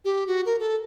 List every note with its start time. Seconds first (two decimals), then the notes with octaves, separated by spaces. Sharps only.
0.05 G4
0.27 F#4
0.46 A#4
0.59 A4